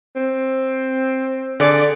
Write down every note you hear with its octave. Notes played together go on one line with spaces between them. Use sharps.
C4
D3 G#4 D5